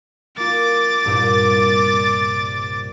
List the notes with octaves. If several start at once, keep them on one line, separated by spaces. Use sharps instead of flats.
A#3 F4 D6 A6
C2 G2 A#2